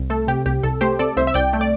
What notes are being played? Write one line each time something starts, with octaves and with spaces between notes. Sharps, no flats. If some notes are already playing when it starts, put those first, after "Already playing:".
Already playing: C2
A3 A4
C3 G4
C2 G4
C2 A4
A3 G4 C5
C3 A4 D5
C2 C5 E5
E5
C2 D5 G5
A3
D5